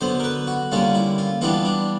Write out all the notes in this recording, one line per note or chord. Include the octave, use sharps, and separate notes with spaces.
D3 F#3 B3 C5
A#4
B4
F#4
D3 G3 A#3 C#4 F4
E4
F4
E3 G3 B3 D4 F4
D4